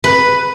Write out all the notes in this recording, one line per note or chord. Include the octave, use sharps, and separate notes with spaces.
B4